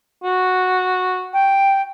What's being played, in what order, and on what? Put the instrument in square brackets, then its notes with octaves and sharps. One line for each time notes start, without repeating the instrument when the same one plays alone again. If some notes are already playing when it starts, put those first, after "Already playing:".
[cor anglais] F#4
[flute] G5